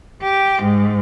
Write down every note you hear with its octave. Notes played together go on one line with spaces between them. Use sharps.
G4
G#2